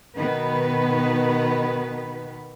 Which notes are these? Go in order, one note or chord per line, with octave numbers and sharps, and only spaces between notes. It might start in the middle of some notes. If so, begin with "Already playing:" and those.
B2 D#3 B3 B4